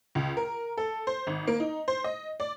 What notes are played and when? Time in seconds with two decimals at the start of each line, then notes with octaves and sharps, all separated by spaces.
0.15 C#2
0.37 A#4
0.78 A4
1.07 C5
1.27 G#1
1.47 A#3
1.60 D#4
1.88 C5
2.04 D#5
2.40 D5